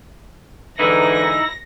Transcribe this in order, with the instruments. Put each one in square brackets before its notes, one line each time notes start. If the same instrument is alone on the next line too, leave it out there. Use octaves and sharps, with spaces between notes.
[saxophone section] G#2 D3 E3 [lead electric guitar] D#4 E4 [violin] A#6